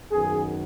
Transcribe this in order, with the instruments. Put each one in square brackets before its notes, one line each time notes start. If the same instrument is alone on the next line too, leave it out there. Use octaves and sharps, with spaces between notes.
[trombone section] F#2 D#3 B3 G#4